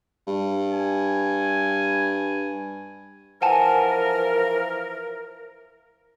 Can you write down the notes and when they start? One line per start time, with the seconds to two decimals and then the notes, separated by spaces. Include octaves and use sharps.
0.27 G2
0.73 G#5
3.42 E3 F3 A#4 F#5 G#5 A5